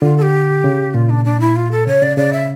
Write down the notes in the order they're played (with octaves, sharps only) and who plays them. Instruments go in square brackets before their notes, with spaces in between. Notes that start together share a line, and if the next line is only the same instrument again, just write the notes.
[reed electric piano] D3 [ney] F4
[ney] A4
G4
[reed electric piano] C#3
[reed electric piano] A#2 [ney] F4
[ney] D4
D4
E4
F4
A4
[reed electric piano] C#3 [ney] C#5
[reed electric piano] C#3 [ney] D5
[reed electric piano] C#3 [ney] D5
[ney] E5